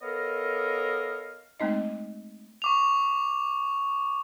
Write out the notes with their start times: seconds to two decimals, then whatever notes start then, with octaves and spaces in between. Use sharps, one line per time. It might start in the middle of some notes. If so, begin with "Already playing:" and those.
0.02 B3 A4 A#4 C#5 D#5 F5
1.60 G#3 A3 C4 D#4 D#5
2.62 C#6 D6 F7